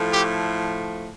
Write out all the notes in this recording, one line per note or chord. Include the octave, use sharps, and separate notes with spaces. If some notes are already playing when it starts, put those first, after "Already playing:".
Already playing: A2 F3 A3
G4